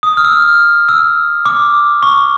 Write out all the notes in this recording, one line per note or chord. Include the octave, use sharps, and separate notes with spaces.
D#6
F6
E6
F6
E6
D6
C#6